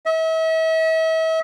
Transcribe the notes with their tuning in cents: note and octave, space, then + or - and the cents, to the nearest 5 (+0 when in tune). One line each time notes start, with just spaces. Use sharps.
E5 -40